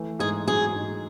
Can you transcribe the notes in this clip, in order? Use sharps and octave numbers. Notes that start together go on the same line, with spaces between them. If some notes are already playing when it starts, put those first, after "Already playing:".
Already playing: E3 A3
G#2 G#4
F#3 G#4
G#2